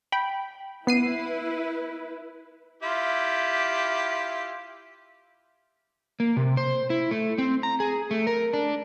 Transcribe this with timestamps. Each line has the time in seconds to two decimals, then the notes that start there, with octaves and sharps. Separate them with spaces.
0.12 G5 B5
0.87 B3 E4 B4 C7 D#7
2.83 E4 F4 G4
6.20 A#3
6.37 C3
6.57 C5
6.90 E4
7.11 A3
7.38 C4
7.63 A#5
7.80 G#4
8.11 A3
8.27 A#4
8.53 D4